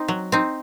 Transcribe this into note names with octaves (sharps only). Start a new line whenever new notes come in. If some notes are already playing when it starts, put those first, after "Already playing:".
Already playing: C4 D#4
F#3
C4 D#4